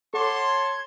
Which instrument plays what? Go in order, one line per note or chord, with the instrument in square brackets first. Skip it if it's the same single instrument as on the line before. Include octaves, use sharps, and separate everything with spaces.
[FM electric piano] A4 F#5 [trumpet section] C#5 A5 C6 [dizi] D6
[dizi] G#6